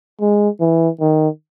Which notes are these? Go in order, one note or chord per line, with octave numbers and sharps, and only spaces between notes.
G#3
E3
D#3